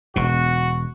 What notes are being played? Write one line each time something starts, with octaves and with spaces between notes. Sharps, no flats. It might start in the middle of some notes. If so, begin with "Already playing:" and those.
E1 B2 F#4